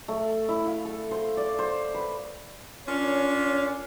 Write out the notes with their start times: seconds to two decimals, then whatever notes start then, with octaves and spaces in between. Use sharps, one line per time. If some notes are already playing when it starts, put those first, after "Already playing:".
0.08 A3
0.48 E4
0.67 F5
0.85 A4
1.11 C5
1.37 D5
1.59 C5
1.94 B4
2.87 C#4 D4 F4 A#4 C#5